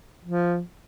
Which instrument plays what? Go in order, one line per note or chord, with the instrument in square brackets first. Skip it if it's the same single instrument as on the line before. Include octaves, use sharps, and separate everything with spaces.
[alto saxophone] F3